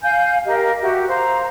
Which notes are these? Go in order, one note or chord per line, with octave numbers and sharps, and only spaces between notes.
F5 G#5 G6
G4 A#4 D#5 F5
F#4 G4 E5
C5 F5 A#5